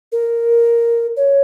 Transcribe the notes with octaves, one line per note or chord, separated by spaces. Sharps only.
A#4
C#5